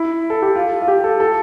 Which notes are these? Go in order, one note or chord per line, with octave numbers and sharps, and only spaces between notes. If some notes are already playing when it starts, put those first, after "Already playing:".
Already playing: E4
A4
G4
F4
F4
G4
A4
A4